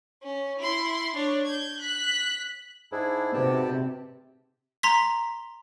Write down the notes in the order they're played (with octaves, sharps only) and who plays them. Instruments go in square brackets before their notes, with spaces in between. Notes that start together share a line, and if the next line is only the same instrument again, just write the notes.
[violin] C#4
E4 C6
D4 C#5
G6 G#6
F#6 B6
[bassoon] G#2 [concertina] D4 E4 G#4
[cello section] C3 [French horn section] F#4 B4 C5 [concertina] G4 D5 A5
[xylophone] A#5 C6 B6